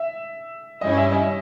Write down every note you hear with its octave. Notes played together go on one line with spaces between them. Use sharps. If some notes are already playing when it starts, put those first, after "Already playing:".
Already playing: E5
G2 G3 C#4 E4 D#5
E5
D#5